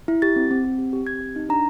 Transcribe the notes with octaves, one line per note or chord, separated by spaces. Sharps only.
E4
G4 A6
C4
C4
C4
G4
G4
C4 G#6
G4
D#4
D4 A#5